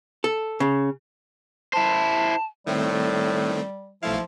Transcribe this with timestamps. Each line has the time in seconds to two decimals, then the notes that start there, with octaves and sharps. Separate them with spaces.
0.24 A4
0.60 C#3
1.73 E4 C5 A5
2.67 A2 D#3 G3 A3 C4
4.03 B1 F3 A3 E4 F5